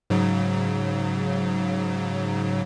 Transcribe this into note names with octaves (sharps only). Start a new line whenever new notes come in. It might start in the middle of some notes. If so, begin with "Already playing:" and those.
G#2 C#3 F#3